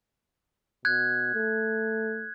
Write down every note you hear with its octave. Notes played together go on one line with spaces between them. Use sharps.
B2 F#6 G#6
A3